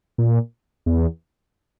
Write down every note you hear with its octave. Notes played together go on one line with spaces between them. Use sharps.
A#2
E2